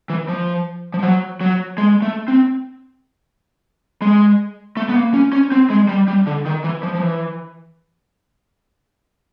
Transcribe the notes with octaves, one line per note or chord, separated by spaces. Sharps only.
E3
F3
F3
F#3
F#3
G#3
A3
C4
G#3
A3
B3
A#3
C#4
C#4
C4
G#3
G3
G3
D3
D#3
E3
F3
F3
E3